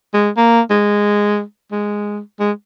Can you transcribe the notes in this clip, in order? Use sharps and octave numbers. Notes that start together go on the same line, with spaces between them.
G#3
A#3
G#3
G#3
G#3